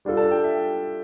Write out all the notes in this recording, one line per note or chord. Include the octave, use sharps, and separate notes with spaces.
G3 D4 F4 A4
A5
G5
E5